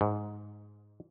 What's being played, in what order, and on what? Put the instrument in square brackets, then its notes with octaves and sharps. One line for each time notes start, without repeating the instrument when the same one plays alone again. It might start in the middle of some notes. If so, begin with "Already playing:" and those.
[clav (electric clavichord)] G#2